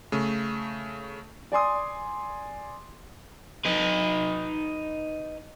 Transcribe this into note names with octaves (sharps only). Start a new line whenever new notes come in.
C#3 A3
D5 G#5 C6 D#6
D#4 B4